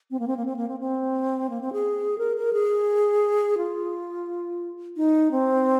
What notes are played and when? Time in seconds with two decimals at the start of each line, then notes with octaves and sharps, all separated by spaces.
0.11 C4
0.19 A#3
0.27 C4
0.37 A#3
0.46 C4
0.56 A#3
0.68 C4
0.80 C4
1.50 A#3
1.61 C4
1.73 G#4
2.18 A#4
2.37 A#4
2.53 G#4
3.58 F4
4.96 D#4
5.31 C4